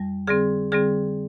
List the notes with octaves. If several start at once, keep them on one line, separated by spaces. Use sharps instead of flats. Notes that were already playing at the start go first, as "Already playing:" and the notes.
Already playing: F2 G3
D3 G3 C4 G#4
D3 G3 C4 G#4